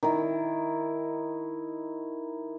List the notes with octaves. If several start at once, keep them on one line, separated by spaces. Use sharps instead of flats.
D#3 E4